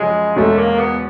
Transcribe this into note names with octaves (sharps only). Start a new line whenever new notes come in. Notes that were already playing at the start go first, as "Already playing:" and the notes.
Already playing: F#2 C#3 F3 G#3
E2 B2 G#3 A3 C#4
A#3
B3